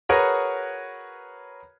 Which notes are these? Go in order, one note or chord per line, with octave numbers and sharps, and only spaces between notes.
F#4 G#4 A#4 B4 C#5